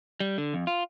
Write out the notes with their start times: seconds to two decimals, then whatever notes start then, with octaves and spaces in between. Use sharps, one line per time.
0.20 G3
0.38 D3
0.54 F2
0.67 F4